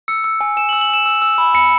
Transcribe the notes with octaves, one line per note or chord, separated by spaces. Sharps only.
E6 C#7
E6
G#5
G#5 E7
F#7
E6
F#7
G#5 E7
E6
E6
B5
B5 C#7